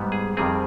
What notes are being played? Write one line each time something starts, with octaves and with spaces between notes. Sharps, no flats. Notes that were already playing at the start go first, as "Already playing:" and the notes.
Already playing: G#2 G3 B3
G#4
F2 D#3 G3 C4 G#4